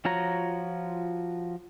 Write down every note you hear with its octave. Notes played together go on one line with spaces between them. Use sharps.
F3 F4 F#4 C#5 A#5